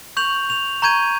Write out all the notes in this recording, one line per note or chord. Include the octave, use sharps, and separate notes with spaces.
C#6 G6 F7 F#7
F7
A#5 C#6 G6 G#6 D#7